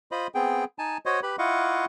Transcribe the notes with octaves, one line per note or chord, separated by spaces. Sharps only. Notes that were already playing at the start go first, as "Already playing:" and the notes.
F4 C5 D#5 B5
B3 C4 G#4 G5
D#4 G#5 A5
F#4 C5 C#5 D#5
G4 B4 B5
E4 F4 D#5 F5 F#5 C#6